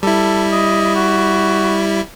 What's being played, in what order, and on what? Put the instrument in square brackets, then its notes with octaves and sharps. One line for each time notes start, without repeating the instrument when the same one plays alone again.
[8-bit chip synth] G3 E4 [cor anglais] A4
[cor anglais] D#5
F#4